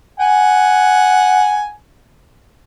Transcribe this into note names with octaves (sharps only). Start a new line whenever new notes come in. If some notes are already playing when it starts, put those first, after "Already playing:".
F#5 G#5